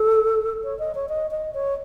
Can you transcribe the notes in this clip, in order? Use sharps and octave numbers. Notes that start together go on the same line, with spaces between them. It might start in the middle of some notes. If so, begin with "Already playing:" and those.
Already playing: A4
C#5
D#5
C#5
D#5
D#5
C#5